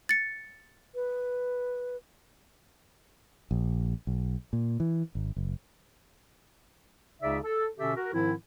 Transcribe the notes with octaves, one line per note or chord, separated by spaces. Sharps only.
A6 C#7
B4
A#1
B1
A#2
E3
G#1
F#1
C#2 C#3 D#4 D5 E5
A4
B2 D3 C#4 G4 A4 E5
F#4 A#4
G#2 D#3 F3 C4 E4